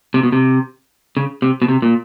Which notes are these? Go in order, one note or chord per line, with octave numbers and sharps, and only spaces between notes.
C3
B2
C3
C#3
C3
B2
C3
A#2